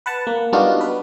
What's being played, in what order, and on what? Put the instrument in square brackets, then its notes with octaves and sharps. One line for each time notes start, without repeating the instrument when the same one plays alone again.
[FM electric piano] B4 F#5 A5
A#3
G3 B3 D4 D#4 F4 F#4
B4